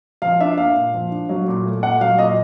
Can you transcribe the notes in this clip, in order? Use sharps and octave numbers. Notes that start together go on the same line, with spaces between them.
F3 F5
D4 E5
A#3 F5
A#2
F3
D4
F#3
A#2
A3
A#2 F#5
F#3 F5
A#2 D#5